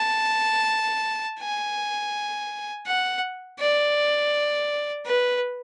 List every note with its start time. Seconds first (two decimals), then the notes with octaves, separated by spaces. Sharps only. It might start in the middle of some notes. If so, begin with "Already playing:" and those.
Already playing: A5
1.39 G#5
2.86 F#5
3.59 D5
5.06 B4